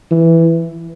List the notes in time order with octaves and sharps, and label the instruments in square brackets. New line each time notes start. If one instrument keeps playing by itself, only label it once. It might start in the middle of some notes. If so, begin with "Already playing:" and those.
[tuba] E3